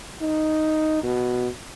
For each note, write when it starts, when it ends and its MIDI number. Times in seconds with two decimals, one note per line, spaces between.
0.22 1.00 63
1.03 1.48 47